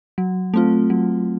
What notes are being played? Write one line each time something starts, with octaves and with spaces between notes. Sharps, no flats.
F#3
A3 C4 F4
F#3